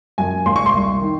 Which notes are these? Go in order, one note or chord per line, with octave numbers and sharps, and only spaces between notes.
F#2 G#5
G#1 C6
C#6
C6
C2
D#3